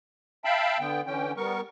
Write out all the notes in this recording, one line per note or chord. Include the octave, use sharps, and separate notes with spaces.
E5 F5 G5 A5 B5
D3 B3 G5
D3 E3 C#4 G5
G3 B3 A#4 C#6